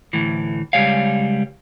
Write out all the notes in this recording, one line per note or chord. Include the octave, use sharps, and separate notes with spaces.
D2 A2 E3
C#2 C3 G3 G#3 C#5 F5